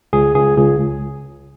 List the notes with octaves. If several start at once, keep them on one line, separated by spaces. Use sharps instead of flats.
C#2 G#4
C#2 G#4
C#2 G#4